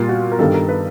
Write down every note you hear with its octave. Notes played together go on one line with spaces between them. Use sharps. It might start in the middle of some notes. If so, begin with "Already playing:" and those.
Already playing: A#2 G3 A#3 F4
F#4
A#4
G2 D#3 G3 A4
A#4
B4